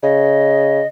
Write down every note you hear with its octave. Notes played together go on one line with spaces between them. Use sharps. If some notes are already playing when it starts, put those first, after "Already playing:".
C#3 D#5